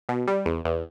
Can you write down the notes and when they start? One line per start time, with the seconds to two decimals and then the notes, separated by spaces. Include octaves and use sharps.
0.09 B2
0.27 G3
0.46 E2
0.65 E2